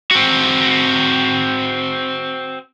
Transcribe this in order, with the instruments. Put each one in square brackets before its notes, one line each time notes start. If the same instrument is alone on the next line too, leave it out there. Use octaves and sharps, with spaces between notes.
[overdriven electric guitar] C4 F#4